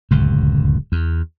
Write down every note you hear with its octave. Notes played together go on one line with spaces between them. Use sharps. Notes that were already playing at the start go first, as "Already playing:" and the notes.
D1 C#2 F#2
E2